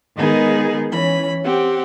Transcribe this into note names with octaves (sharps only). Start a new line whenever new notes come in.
D#3 G#3 B3 D#4 G#4 A#4
E3 C#4 B5
C4 G4 F#5